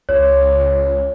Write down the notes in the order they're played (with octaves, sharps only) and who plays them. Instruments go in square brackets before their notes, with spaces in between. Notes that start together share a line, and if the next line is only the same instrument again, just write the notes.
[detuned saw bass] C#2 [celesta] C#5